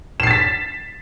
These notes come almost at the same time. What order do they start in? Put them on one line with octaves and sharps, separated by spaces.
E7 C7 A6 B6